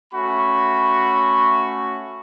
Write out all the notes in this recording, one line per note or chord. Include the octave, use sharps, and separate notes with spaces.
A3 C#4 F#4 B5